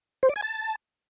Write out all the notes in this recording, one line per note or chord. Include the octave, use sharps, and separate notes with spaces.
C5
D5
G#5
A5